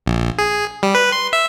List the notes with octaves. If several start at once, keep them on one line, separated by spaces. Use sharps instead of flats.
A#1
G#4
G3
B4
C6
E5